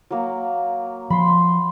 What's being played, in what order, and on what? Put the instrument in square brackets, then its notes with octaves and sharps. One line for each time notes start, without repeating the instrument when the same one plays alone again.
[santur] F#3 A#3
[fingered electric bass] F3 [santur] B5 C6